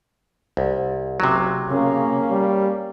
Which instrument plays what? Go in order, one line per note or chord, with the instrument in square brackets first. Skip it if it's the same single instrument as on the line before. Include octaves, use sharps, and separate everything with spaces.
[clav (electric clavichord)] C2
[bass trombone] F#1 [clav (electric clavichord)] C3 F#3
[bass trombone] C#3 [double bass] A#3 C#4
[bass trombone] G3